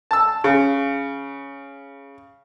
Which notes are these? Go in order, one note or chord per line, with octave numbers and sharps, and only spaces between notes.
A5 E6
C#3